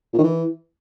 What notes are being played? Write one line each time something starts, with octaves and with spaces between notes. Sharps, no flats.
A#2
D#3
E3